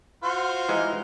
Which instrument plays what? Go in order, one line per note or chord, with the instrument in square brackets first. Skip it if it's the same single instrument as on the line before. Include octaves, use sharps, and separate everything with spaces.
[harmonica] F4 F#4 C5
[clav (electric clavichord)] E3 G#3 D#4